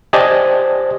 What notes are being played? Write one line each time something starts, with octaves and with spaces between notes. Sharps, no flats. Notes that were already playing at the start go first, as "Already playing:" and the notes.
G4 C5 D5 D#5 G#5 A5